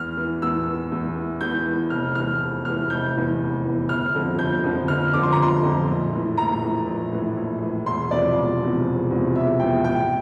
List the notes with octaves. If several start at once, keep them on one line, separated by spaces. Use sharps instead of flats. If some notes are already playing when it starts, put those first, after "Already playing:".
Already playing: E2 F6
E3
E2 E6
E3
E2
E3
E2 G6
E3
F1 F6
E2 E3 F6
F1
E2 E3 F6
F1 G6
E2 E3
F1
E2 E3
G1 F6
F2 D3 F3
G1 G6
F2 D3 F3
G1 F6
F2 D3 F3 D6
C6
A#5
G1 C6
F2 D3 F3
A#1
A2 E3
A#1 A#5
A2 E3
A#1
A2 E3
A#1
A2 E3
E1 C6
E2 C3 F3 D5
E1
E2 C3 F3
E1
E2 C3 F3
E1 E5
E2 C3 F3 G5
A1 G5